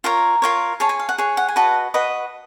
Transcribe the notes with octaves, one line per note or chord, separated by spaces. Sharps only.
F4 A#4 C#5 A#5
F4 A#4 C#5
G#4 C#5 A5
G#5
F5
F#5
G#4 C#5
F#5
G#5
F#4 B4 D#5 A5
F#4 B4 D#5